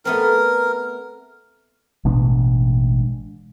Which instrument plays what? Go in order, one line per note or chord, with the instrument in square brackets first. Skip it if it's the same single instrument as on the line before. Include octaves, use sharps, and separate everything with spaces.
[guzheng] A3 B3 C4 [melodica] A#4
[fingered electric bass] A1 B2 G#3 D4